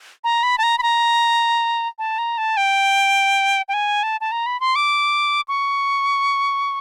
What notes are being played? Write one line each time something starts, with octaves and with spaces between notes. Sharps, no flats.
A#5
B5
A5
A#5
B5
A#5
A5
A#5
A5
G5
G5
G#5
A5
A5
A#5
B5
C6
D6
C#6